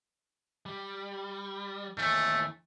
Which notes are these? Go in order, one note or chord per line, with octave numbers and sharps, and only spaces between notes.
G3
D#2 E3 A3